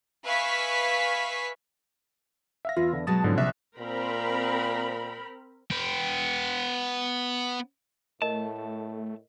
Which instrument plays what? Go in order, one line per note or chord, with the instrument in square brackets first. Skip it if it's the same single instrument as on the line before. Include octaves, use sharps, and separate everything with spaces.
[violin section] B4 E5 F5 G#5 C#6 B6
[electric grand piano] E5 F5 A#6
[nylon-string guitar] E2 [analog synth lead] F4
[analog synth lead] D3
[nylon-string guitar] B2 F#3 G#3 [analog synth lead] A5 [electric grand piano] D#6 A6
[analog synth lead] G#2 [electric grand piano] D3 F3 C#4
[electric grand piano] A#1 E5 F#6 [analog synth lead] C3
[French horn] A#2 [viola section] C4 A#4 B5
[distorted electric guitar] B3 G5
[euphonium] A2 [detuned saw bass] A3 [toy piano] A#4 D#5 [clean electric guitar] A5